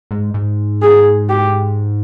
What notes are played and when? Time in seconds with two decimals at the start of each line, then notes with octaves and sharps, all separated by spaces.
0.11 G#2
0.34 G#2
0.82 G#4
1.29 G4